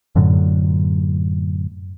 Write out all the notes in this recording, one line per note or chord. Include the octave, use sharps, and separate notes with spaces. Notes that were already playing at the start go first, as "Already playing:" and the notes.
F#2 A2 D3 F#3